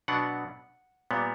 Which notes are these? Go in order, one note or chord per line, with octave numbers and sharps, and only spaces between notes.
B2 F#3 B3 D4 F#5
A#2 G3 B3